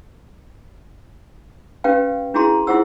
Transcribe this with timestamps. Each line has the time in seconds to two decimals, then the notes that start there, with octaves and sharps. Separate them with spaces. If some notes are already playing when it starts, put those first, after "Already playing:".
1.84 C#4 G4 B4 F5 G5
2.34 D4 E4 F#4 G#4 A#5 C6
2.67 E4 F4 G#4 C5 F#5 E6